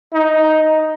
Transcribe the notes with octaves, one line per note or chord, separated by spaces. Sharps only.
D#4